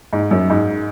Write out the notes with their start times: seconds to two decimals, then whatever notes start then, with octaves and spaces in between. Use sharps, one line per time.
0.13 G#2
0.31 F#2
0.50 G#2